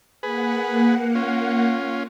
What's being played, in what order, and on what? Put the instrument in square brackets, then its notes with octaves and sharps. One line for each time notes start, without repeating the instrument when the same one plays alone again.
[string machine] A#3 F#5 [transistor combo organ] G#4 B4
[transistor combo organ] C#4 F4